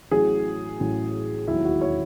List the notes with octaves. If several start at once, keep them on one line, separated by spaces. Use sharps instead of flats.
A1 A2 F#3 G#4
A1 A2 F#3
E1 D#2 D#3 F#3 E4
F#4
C#5